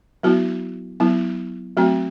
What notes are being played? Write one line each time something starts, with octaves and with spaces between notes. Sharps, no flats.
F#3 B3 E4 F#4
F#3 B3 E4
F#3 A3 C4 F#4